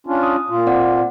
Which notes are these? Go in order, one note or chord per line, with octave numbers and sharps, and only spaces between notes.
C#4 D4 F4
D#6
A#2 F4
C4 D5 F#5